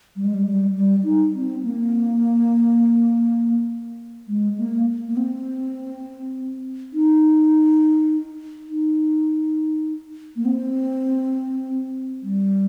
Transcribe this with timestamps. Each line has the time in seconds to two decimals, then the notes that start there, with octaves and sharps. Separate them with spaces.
0.16 G3
0.24 G#3
0.34 G3
0.46 G3
0.75 G3
1.04 D#4
1.35 C4
1.63 A#3
4.28 G#3
4.58 A#3
5.08 A#3
5.17 C4
6.93 D#4
8.70 D#4
10.36 A#3
10.45 C4
12.23 G3